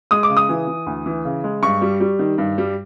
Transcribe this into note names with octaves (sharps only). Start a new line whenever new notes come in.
G#3 D#6
D6
C#3
D#6
E3
E3
D2
E3
C#3
G#3
G2 C#6
G3
G3
D#3
G2
G3